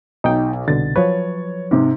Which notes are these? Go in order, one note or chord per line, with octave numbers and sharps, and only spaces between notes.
B1 D#4 G5
C2 B2 D3 A6
F3 F#3 B4 C#5
G#2 C3